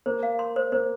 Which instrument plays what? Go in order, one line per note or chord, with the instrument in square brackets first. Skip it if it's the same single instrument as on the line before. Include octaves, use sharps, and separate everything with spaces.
[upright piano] A#3 [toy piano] C5
[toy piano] F5
C6
C5
[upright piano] A#3 [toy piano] C5